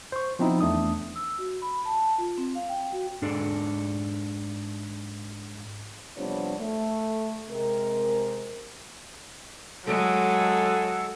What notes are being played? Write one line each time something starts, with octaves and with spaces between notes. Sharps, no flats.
C5 C#6
F3 B3 C4 D#4 E4
E2 A3 D4 D#6
E6
F#4
B5
A5
F4
C4
F5
G5
F#4
G#2 D4 G#4 A4 D5
C3 F3 G3 B3 D4 C#5
A3
C3 G#3 A#4
F#3 G#3 A4